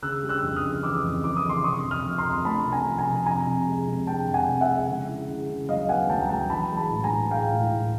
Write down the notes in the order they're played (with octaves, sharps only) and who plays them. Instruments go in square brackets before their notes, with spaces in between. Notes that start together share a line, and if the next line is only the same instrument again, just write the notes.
[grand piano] C#3 E6 F#6
G3
E6 F#6
F2
D#6 F6
C#3
E3 D6 E6
F2
E3 D6
D#6
C#3
C6 D6
C3 C#6 D#6
F2
D#6 F6
F3
A#5 C6
F2
A3 A5 B5
C3
G#5 A#5
F3
G#5 A#5
C3
F2 G#5 A#5
C3
G#3
C3
G#3 G5 A5
F2
F#5 G#5
C3
E5 F#5
G#3
C#3
E4
C#3
C#3
F#3 D#5 F5
B3 F#5 G#5
F#3 G5 A5
A#5
F#3 G5 A5
E3 A5 B5
G#3
A5 B5
A2
G#5 A#5
A2
G#3 F5 G5
A2
A2